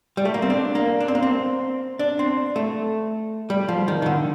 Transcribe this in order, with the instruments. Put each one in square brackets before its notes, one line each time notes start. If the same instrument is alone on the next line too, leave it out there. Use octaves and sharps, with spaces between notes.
[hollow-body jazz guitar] G3
A3
A#3
C4
D4
A#3
D4
C4
A#3
C4
D4
C4
A3
G3
F3
D#3
D#3
D3